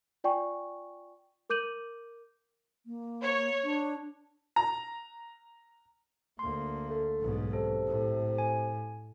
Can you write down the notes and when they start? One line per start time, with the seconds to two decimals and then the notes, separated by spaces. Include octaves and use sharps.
0.24 F4 D5 G5 G#5 C#6
1.50 A#4 D6 G6 D#7 F#7
2.86 A#3
3.21 C#5
3.64 D4
4.56 A#5
6.39 D2 A#3 C6
6.90 A3
7.20 B1 G#2
7.53 C3 A4
7.87 A2
8.38 G#5